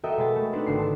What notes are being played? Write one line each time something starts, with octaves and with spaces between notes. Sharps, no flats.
F#4 A4 A#4 D#5 E5 G5
B2 G#3 B5 A6
A3
B3 C4 D4 D#4 B4
G#1 D3 C7
A5